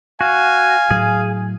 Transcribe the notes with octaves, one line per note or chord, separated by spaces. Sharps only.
F#4 F5 G#5
A2 F#3 G#4